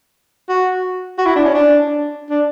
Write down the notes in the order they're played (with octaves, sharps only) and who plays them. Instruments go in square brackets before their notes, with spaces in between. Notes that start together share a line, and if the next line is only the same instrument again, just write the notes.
[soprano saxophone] F#4
F#4
E4
D4
C#4
D4
D4